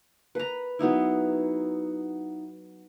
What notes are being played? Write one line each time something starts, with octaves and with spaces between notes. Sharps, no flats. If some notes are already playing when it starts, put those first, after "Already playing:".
B4 A#5
F#3 B3 D#4 E4